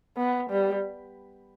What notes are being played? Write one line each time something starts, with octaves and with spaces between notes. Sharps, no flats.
B3
G3